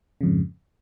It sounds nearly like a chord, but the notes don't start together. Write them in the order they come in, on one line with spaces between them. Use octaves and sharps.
C#3 F2 G#2